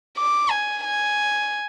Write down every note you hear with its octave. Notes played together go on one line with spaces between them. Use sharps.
D6
G#5
G#5